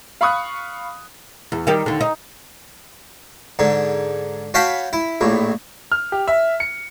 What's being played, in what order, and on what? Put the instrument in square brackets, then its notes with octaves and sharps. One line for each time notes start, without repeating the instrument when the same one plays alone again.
[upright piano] F5 B5 C#6 D#6 F#6
[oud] E2
D#3 G3 G4
D#2 D3
D#4
[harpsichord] G#2 D3
F#4 C#5 F5 G5 A5 B5
E4
A#1 A2
[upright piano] F6
G4
E5
C#7